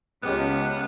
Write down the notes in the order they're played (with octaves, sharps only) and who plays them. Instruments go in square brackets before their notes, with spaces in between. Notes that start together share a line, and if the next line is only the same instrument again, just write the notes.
[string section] C#2 [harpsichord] G#3 G4 F#5 [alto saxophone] B3